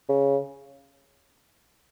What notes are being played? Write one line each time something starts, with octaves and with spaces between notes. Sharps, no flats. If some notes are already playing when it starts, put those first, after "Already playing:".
C#3